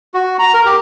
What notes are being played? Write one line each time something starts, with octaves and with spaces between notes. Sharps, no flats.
F#4
A#5
A#4
G4